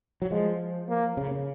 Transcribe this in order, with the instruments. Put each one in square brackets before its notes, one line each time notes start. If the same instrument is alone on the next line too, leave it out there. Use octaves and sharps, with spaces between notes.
[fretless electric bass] F#3
[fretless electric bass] F3 [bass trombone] G#3
[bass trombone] A#3
[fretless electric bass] C#3
C#3